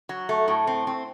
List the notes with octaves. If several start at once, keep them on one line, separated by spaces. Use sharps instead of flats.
F#3
A3
A2
C4
C4